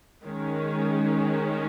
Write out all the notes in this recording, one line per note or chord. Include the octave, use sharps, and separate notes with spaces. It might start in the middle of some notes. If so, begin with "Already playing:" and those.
D#3 G#3 C#4